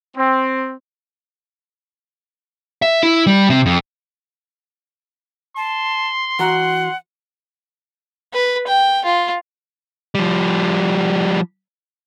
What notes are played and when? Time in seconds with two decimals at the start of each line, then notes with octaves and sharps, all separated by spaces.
0.15 C4
2.82 E5
3.03 E4
3.27 G3
3.50 C3
3.66 F2
5.57 A5 C6
6.39 E3 F#4 F#5 A#5
8.34 B4
8.67 G5
9.05 F4
10.15 F3 G3